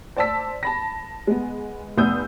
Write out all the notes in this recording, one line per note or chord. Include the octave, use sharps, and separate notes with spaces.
C5 D5 A5 E6 B6
A5 B5 A#6
G#3 B3
F1 B3 D#6 E6 G6